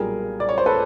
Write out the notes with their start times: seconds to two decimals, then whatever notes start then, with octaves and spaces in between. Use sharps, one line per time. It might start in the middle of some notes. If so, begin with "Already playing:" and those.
Already playing: B1 A#2 G3 G#4 A#4
0.40 D5
0.49 C#5
0.58 C5
0.66 A4 B4